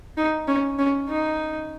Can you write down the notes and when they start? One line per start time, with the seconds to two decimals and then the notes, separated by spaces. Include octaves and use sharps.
0.17 D#4
0.48 C#4
0.79 C#4
1.09 D#4